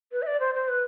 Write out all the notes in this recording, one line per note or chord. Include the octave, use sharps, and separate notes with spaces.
B4
E5
D5
C5
C5
B4